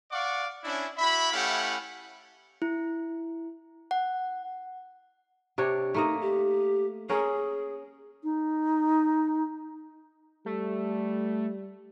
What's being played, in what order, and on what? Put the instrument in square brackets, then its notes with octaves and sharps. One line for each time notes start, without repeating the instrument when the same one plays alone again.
[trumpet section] D5 F5 F#5 C#6 D6
C#4 D4 E4
E4 F#4 E5 B5
A3 C#4 E4 G4 F5 F#5
[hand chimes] E4
F#5
[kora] C3 D4 C#5
[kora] A3 A#3 D#5 [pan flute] D#4
[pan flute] G4
[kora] C#4 A#4 [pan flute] G#4
[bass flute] D#4
[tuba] G3 [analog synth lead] A3